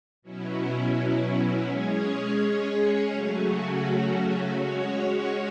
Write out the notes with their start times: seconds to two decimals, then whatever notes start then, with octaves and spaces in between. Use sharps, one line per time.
0.22 B2 F#3 C#4 E4
1.65 G#3 C#4 G#4 C#5
3.08 C#3 F#3 A3 C#4 F#4
4.50 G#3 C#4 F#4 C#5